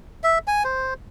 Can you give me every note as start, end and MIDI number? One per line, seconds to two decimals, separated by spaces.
0.24 0.39 76
0.48 0.63 80
0.64 0.94 72